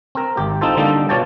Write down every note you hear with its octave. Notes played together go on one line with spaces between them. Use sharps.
C4 A#4
G#1 G4
C4 D#4 F4 A4 C5
D3 G3 A#3 D#4 A4
B2 F4 C#5 D5 G5 A5